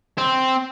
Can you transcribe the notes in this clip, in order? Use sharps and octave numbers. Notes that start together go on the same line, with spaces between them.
C4